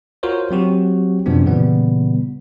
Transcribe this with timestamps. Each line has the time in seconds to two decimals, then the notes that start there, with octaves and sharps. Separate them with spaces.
0.23 F4 F#4 A#4 C5 C#5
0.51 F#3 C4 F#4 G4
1.26 F#2 C3 F3 G3 B3 D4
1.45 A#2 C#3 E3 G3 B3